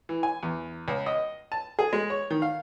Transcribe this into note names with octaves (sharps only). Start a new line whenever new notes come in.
E3
G#5
E2
C#2
D#5
A5
G#4
G#3
C#5
D#3
F5